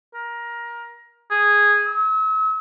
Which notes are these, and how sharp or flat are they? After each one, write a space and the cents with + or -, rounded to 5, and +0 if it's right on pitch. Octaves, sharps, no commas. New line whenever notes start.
A#4 +20
G#4 -5
E6 -40